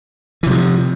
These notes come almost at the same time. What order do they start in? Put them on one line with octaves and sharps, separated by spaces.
E3 C3 F3